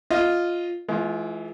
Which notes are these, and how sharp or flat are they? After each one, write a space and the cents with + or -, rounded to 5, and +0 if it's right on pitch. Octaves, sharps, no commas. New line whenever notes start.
F4 +0 D#5 +0
E3 +0 G#3 +40 F4 +0